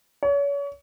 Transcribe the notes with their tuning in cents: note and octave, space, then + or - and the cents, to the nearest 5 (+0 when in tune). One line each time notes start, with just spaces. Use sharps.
C#5 +35